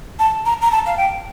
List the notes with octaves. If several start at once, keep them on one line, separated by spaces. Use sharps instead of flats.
A5
A#5
A#5
A5
F5
G5